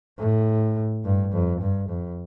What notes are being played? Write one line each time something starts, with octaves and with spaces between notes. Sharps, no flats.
A2
G2
F2
G2
F2